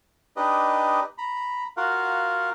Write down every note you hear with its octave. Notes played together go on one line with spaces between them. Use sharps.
D4 D#4 G4 B4 D#5
A#5 B5
F4 F#4 A#4 F5 F#5